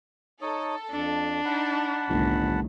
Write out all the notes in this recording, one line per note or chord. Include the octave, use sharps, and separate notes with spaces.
D#4 A4 C#5 D#6
F2 D4
D#4 F#5 A5 B5
G1 C2 A2 D#3